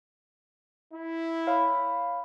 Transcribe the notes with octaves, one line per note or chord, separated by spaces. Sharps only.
E4
C#5 F5 B5